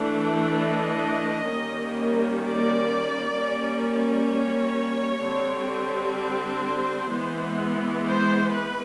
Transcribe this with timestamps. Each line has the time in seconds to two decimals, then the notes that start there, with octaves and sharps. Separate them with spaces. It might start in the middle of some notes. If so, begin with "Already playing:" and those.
Already playing: E3 A3 D4
0.55 D#5
1.50 D#3 G3 A#3 C#4
2.44 D5
3.37 G3 A#3 C#4
4.31 C#5
5.25 D3 G3 C4
6.18 C5
7.12 E3 G#3 B3
8.07 C5
8.53 B4